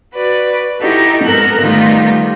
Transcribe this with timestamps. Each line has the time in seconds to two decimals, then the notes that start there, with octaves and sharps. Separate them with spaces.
0.14 F#4 B4 D5
0.80 D#4 E4 F#4 G4 A4
1.24 G#2 B3 A4 A#4 A#5 F#6
1.61 D#3 G3 A3 B3 D#4 F4